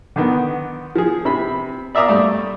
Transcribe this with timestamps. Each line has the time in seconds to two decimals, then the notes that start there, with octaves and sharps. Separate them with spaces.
0.16 D3 D#3 B3
0.95 F3 G#4
1.25 C3 B5
1.95 D5 E5 F5 A#5 D6 D#6
2.08 G2 A3 D5